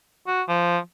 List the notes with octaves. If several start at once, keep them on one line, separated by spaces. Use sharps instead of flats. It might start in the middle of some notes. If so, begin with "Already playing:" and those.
F#4
F3